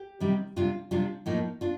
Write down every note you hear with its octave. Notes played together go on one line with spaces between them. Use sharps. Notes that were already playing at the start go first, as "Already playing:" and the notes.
Already playing: G4
C3 D#3 G3 C4
C3 G3 D4 F4
C3 G3 D4 F4
A2 F3 A#3 D#4
D4 F4